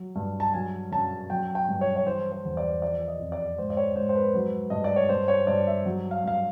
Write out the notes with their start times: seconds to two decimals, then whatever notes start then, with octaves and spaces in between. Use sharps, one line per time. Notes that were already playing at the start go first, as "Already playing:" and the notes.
Already playing: F#3
0.16 G2
0.40 A5
0.54 F#3 G#5
0.92 F#2 A5
1.30 F#3 G5
1.55 G5
1.69 G2
1.81 C#5
1.96 C#5
2.05 E3 C5
2.32 C5
2.45 E2
2.57 D5
2.82 F3 D5
3.08 D#5
3.20 F2
3.32 D5
3.58 G#2 C5
3.70 D5
3.77 C#5
3.96 G#2 C5
4.09 C5
4.15 B4
4.34 F#3
4.70 G2 D#5
4.84 D5
4.96 C#5
5.09 G2 C5
5.28 C#5
5.47 G2 D5
5.67 E5
5.85 F#3
6.11 F5
6.24 G2 F5